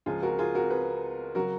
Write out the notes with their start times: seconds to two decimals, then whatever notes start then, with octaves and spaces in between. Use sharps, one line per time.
0.06 C#2 C#3 F3 F4 G#4
0.22 F#4 A#4
0.38 F4 G#4
0.55 F#4 A#4
0.70 G#4 B4
1.35 C#3 F#3 F#4 A#4